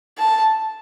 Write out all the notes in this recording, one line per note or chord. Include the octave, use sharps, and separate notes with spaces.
A5